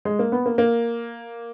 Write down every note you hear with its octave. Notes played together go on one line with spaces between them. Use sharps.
G#3
A#3
B3
A#3
A#3